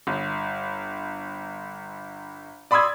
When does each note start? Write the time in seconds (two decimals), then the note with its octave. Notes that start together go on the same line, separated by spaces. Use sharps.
0.07 G1
2.71 D5 B5 C6 D#6 E6 G#6